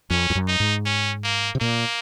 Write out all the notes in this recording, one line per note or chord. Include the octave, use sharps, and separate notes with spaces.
F2 C#4
F2
F#2
D#4
G#2
C#4
A#3
C3
A#2 A#3